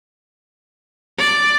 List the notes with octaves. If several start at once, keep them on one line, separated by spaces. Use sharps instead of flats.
D5